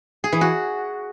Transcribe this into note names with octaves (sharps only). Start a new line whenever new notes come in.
G#4
E3
F#4